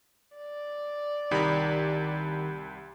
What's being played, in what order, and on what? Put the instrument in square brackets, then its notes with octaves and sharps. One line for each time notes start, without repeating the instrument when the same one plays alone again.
[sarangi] D5
[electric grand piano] C2 G4 B5 [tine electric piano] D#3 A#5